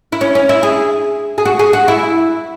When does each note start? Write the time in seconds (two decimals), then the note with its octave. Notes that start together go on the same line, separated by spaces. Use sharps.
0.12 E4
0.21 C#4
0.35 C#4
0.49 E4
0.63 G#4
1.38 G#4
1.45 F#4
1.59 G#4
1.73 F#4
1.88 E4